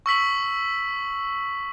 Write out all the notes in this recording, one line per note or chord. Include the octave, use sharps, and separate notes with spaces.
C#6 E6 B6 F#7